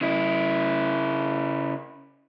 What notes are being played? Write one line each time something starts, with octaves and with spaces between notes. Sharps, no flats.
C#3 E4